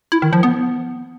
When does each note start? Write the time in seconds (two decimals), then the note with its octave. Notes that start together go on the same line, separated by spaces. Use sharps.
0.12 E4
0.22 D#3
0.33 F3
0.43 B3